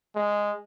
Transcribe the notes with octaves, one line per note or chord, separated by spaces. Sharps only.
G#3